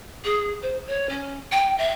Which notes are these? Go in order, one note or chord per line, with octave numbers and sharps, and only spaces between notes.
G#4
C5
C#5
C#4
G5
E5